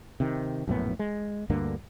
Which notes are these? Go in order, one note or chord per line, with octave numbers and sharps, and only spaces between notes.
C3 D#3
A#1 F#2 A2 B3
G#3
D2 G2 D3 A#3